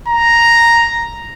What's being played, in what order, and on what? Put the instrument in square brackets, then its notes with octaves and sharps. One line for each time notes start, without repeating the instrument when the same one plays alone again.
[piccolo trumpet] A#5